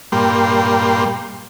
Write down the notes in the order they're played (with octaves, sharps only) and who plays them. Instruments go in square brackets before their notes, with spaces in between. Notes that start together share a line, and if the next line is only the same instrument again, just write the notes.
[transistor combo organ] G2 A#2 G3 A#3 G5 C6